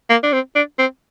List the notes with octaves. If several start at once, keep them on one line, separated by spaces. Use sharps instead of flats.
A#3
D4
C4
D4
C4